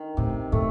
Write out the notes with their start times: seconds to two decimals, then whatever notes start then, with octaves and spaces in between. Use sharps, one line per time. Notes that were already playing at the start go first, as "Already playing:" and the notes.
Already playing: D#3
0.17 A2 C3
0.52 A2 A3